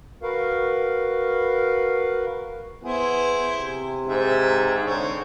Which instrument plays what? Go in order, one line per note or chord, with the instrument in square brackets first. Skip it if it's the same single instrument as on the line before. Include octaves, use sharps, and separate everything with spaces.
[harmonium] F#4 A#4 B4 F5
[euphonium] B3 [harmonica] E4 G#4 C5
[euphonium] C3
[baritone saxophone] G#2 [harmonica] E5
[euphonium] D3 [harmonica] C4 C#5